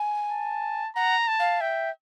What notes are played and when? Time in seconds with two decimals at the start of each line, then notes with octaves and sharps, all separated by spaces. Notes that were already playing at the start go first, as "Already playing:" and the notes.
Already playing: G#5
0.31 A5
0.95 F#5 A#5
1.28 A5
1.39 F5
1.60 E5 G5